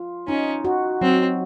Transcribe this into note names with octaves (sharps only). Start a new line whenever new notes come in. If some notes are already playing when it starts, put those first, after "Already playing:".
Already playing: F4
C#4 D#4
F#4
F#3 C4